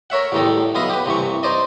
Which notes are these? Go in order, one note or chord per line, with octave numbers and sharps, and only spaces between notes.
A#4 C#5 E5 F#5
A1 E2 D#3 G3 D#4 A4
B1 B3 E4 D#5 F5 D#6
G4 B4
C2 G2 E3 C#6
D#4 C5 D5 D#5